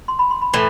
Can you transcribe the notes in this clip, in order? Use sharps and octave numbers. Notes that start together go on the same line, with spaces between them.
C6
B5
C6
B5
A2 E3